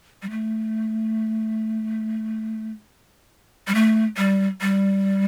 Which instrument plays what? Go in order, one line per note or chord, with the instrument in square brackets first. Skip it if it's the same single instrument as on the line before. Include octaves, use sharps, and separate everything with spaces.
[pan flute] G3
A3
G3
A3
G3
G3